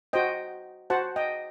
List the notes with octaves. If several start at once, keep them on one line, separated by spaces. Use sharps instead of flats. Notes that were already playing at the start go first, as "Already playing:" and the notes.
F#4 C5 D#5 G5
F#4 C5 F#5 A5
D#5 G5